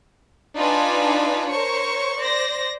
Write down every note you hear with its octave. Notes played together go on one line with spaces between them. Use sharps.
D4 D#4 F4 B4 G#5
A#4 C5 C#5 C#6
C5 D5 A#6